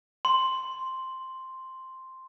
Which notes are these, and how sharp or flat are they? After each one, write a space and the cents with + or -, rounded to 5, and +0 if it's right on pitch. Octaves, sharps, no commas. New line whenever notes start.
C6 +0